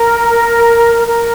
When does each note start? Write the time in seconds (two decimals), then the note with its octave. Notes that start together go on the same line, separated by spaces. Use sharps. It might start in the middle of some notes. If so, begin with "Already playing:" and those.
Already playing: A#4
1.06 A#4